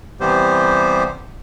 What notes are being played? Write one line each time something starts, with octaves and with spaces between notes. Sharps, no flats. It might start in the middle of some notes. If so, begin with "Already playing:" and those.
C3 E3 G3 B3 G4 C5